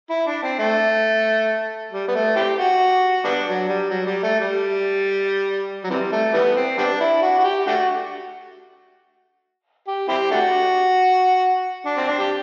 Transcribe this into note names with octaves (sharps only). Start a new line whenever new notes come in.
E4
D4
C4
A3
G3
B3
A3
C4 E4 G4
F#4
G3 B3 D4
F#3
G3
F#3
G3
A3
G3
F#3
C3 E3 G3
A3
E3 G3 B3
C4
G3 B3 D4
E4
F#4
F#4
G4
A3 D4 F#4
G4
C4 E4 G4
A3 D4 F#4
D4
C4
D4
G4